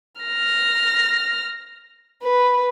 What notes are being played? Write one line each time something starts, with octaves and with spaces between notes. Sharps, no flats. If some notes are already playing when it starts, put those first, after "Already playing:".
F6 A#6
B4